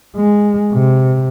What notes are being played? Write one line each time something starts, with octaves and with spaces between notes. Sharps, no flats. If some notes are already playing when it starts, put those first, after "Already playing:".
G#3
C3